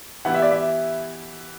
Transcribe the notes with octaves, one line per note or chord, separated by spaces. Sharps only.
E3 B3 E4 G4 F#5
E5
D5
E5